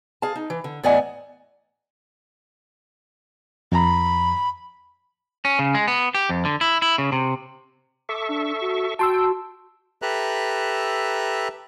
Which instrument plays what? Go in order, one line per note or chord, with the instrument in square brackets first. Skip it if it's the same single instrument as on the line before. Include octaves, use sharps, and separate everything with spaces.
[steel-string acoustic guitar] G#4 F5 A5
D#4
E3
D3
E2 A2 D5 D#5 F#5 G#5
[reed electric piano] F2 A#5 [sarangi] B5
[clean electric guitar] C#4
C#3
G#3
B3
G4
F2
D3
E4
E4
C#3
C3
[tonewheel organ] A4 E5 C#6 [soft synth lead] D6
[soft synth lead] D4
F#4
[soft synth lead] F#4 [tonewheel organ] G5 [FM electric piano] A5 C6 E6
[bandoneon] G4 A4 B4 E5 A#5 F#6